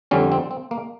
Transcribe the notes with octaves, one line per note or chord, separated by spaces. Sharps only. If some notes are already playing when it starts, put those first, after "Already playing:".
F2 D3 G3 C#4
C4
C4
A#3